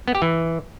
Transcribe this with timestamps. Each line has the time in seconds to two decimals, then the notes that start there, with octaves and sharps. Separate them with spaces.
0.08 B3
0.15 G4
0.22 E3